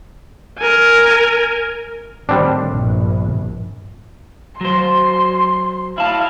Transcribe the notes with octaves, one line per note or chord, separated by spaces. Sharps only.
A#4 G#5
A2 D#3 G3 C4 D4
A#1 G2
F#3 C5 C6
E4 F5 A5